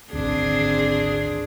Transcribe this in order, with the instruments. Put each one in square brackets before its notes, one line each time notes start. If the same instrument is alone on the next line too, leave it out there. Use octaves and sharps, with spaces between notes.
[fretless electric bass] G#1 D2 [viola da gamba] C4 D4 G#4